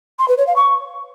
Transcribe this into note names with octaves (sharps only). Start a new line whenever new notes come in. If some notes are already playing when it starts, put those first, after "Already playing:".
C6
B4
C#5
F5
C#6